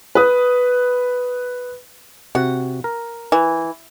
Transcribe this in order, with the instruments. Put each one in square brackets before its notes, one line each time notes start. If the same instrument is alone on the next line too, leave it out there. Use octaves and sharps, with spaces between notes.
[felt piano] B4 D#6
[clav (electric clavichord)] C3 F#4 [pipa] F#5
[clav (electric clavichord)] A#4
[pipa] E3